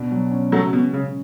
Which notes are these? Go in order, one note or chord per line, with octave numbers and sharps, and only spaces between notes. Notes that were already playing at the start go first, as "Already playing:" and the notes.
Already playing: B2 D4
F#3
C#4
C#3 F#3 A3
B2 G#3
C#3 G#3